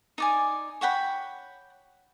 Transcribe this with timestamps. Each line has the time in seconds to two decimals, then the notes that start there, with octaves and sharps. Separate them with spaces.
0.18 D#4 D5 G#5
0.81 C#5 F#5 G5 B5